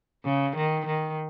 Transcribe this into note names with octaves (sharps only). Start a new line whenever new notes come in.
C#3
D#3
D#3